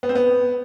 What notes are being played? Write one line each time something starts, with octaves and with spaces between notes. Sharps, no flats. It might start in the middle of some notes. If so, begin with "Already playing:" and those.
B3
C4
B3